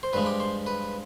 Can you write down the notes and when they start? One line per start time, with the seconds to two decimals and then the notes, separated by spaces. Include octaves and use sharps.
0.03 C5
0.13 G2 F3 G#3 B4
0.26 G4
0.40 C5
0.66 B4